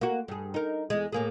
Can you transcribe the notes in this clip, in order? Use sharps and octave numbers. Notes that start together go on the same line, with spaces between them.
A#3 F#4
G2 G#4
D#4 A#4
E2 G#3
A2 A#3 G#4